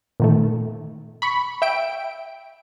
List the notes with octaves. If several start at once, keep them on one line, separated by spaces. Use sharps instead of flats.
A#2 D#3 A3
B5 C#6
E5 G5 D7